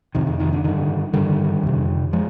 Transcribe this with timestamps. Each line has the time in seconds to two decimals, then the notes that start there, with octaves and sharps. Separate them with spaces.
0.15 F2 C3 D#3
0.27 D#3
0.40 D#3
0.53 D3
0.64 G2 D3 D#3
1.13 G2 D3 D#3 G3
1.63 F2 C3
2.13 F3 G#3